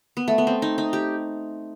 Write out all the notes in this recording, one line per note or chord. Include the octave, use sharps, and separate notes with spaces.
B3
A3
B3
C4
D#4
D#4
G4